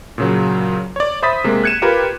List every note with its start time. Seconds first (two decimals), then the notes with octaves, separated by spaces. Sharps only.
0.18 A#2 C#3 F#3
0.96 C#5 D5
1.22 C5 E5 B5 D#6 A6 B6
1.44 C3 G#3 A#3
1.64 F#6 G#6 C#7 D#7 E7
1.82 F4 G4 A#4 B4